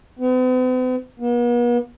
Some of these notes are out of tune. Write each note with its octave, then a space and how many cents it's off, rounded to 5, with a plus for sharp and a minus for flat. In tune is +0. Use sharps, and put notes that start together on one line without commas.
B3 +45
B3 -45